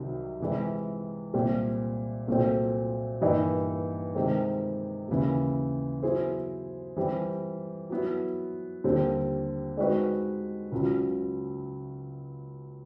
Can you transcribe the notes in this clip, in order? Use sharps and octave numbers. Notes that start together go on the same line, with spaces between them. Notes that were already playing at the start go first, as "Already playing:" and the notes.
Already playing: C2 C3 D#3 F#3
C3 E3 G#3
C2 A#2 G3 C4
C2 A#2 F#3 A3 C4
G2 E3 G3 A#3 D#4
C3 D#3 G#3 C4
D#2 C#3 E3
F#3 B3 E4 G#4 C5
E3 G3 C4
F#3 B3 E4
D#2 D3 G3 C4
G#3 C4 D#4 F#4 B4
C#2 C#3 F#3